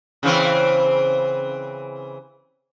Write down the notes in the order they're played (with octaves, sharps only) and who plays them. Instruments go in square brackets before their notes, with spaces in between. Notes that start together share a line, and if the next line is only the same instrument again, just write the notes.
[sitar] C#3 E3 C4